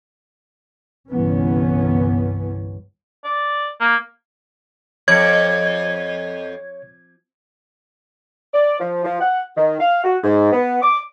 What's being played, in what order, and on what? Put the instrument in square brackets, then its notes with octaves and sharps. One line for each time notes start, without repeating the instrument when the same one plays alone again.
[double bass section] G1 C2 G2 E3 B3 C#4
[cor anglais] D5
A#3
[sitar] F2 [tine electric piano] C#5 C#7 [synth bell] G#6
[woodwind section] D5
F3
F3
F#5
D#3
F5
F#4
G#2
B3
D6